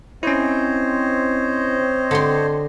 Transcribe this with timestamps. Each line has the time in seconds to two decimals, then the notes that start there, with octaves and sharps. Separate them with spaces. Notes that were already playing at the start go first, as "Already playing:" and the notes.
0.23 C4 C#4 E4 C5 C#5 D#5
2.11 D3 G4 C6